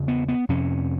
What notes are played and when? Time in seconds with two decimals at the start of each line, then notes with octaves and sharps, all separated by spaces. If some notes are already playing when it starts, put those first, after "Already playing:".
Already playing: E2 C#3
0.08 B3
0.28 B3
0.49 F2 C3 C#4